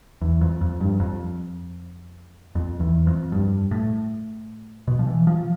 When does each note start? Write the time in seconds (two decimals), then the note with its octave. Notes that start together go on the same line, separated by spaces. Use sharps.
0.21 E2
0.41 F2
0.61 F2
0.80 G2
1.00 F2
2.55 F2
2.80 E2
3.07 F2
3.32 G2
3.71 A2
4.88 B2
4.99 F3
5.07 E3
5.27 F3